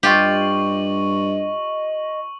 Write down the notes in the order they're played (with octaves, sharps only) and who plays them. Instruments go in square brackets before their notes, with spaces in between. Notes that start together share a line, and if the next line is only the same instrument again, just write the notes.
[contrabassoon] G2 [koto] F4 G4 [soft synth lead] D#5 [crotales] C#6 F#7